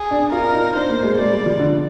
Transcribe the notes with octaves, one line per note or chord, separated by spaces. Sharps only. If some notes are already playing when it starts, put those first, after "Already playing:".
Already playing: G#4
D4
F4 A#4
D#4
D4 C5
A#3
G#3
G#3 D5
G3
F3
D3